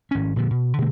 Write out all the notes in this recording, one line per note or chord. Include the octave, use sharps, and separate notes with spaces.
G#1 C#4
A#2 D3 F3
B2
B2 D3 A3 A#3